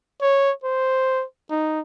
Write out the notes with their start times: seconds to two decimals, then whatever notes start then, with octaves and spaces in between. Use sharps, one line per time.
0.21 C#5
0.64 C5
1.50 D#4